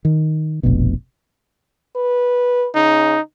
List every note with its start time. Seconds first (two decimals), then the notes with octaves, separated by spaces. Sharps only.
0.05 D#3
0.63 F1 A#1 B2
1.96 B4
2.75 C#3 D#4